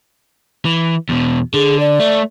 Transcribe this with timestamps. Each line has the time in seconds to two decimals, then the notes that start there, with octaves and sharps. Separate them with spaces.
0.65 E3
1.09 E2 B2
1.54 D3 G#4
1.80 D5
2.00 A3